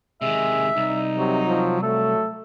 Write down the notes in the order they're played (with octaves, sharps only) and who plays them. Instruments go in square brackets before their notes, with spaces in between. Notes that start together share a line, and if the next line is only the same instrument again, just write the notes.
[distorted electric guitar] C3 D#3 [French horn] G#3 [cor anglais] E5
[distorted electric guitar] C2 [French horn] D#4
[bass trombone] C3 [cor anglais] F#3
[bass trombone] F3
[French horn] F#3 [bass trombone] A3 [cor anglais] A4